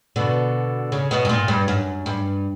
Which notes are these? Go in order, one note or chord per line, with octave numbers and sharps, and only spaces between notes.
B2 D3
C#3
B2
G2
A#2
G2
F#2
G2